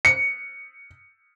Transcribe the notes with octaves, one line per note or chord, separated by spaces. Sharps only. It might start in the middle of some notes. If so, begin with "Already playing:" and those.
C#7